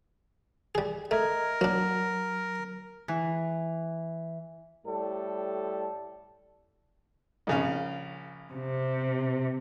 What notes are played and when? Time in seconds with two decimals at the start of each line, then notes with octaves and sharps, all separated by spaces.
0.75 G3 G#4
1.11 A3 A#4 D#5 A#5 G#6
1.61 F#3 A#3 D4
3.08 E3
4.85 A2 G3 A4
7.47 A#1 C#3 F5
8.53 C3